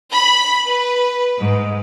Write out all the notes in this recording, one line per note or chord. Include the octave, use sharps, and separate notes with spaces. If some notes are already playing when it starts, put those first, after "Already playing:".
B5
B4
G#2